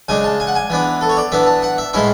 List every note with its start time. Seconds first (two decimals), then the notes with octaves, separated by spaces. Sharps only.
0.09 C#3 G#3 D4 G#5
0.24 A5
0.40 G#5
0.47 F#5
0.55 G#5
0.70 E3 B3 D4
1.01 A4
1.09 C#5
1.17 D5
1.32 E3 B3 D4 E5
1.47 A5
1.62 F#5
1.78 E5
1.93 A2 G#3 C#4 E4 E5